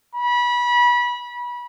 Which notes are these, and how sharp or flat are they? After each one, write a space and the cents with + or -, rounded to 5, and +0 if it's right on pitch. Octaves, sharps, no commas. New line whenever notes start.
B5 -25